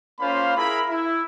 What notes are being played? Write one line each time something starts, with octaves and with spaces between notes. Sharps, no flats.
A#3 C#4 F4 C5 F5 B5
E4 G#4 A#4 B5
E4